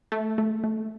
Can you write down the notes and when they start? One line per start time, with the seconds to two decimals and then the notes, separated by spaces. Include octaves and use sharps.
0.12 A3
0.38 A3
0.64 A3